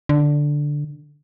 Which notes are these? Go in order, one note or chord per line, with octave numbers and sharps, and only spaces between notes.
D3